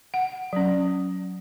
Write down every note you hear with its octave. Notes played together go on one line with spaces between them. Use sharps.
F#5
F#3 C#4